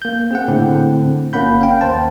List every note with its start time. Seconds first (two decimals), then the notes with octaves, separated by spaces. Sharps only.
0.02 A#3 G6
0.31 C4 G#4 F#5
0.48 A2 D3 C4
1.33 G1 A#3 C#4 F#5 B5 G6
1.61 F5 G5
1.81 D#2 C5 A5